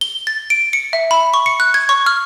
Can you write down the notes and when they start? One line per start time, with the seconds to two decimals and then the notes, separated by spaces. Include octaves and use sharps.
0.01 G7
0.27 A6
0.50 D7
0.73 C#7
0.93 E5
1.11 B5
1.34 C#6
1.46 C#7
1.60 F#6
1.74 G#6
1.89 C#6
2.06 F6